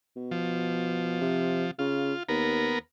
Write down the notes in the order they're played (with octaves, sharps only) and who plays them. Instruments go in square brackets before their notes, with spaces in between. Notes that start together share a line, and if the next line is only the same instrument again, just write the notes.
[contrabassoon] B2
[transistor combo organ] F3
[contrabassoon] C3
[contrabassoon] C#3 [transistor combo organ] F4
[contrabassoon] D#2 [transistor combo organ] B3 A#4